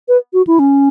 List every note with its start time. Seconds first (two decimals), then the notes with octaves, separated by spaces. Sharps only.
0.08 B4
0.33 F#4
0.47 E4
0.59 C#4